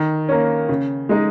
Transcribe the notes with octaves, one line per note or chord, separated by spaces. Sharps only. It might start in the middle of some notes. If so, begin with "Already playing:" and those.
Already playing: D#3
A#3 C#4
C#3
G#3 D#4